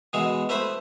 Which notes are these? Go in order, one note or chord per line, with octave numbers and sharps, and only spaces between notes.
B2 E3 G#3 G#4
A3 E4 B4 C5 B5 D#6